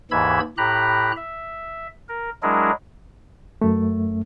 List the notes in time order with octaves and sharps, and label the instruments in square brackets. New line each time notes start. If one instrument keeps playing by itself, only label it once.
[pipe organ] D#2 G#2 E3 B5 E6 G#6
A2 G4 A#5 B5 F#6
E5
A#4
F#3 G#3 D4 E4 G#4 A#4
[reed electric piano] F#2 A3